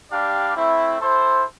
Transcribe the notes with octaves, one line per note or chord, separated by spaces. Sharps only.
G3 D4 G4 D5 F5
A3 C4 E4
E4 A4 C5